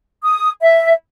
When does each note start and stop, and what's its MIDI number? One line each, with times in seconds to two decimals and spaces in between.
0.23 0.49 87
0.61 0.92 76